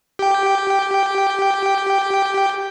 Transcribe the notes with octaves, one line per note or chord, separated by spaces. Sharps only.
G4 G5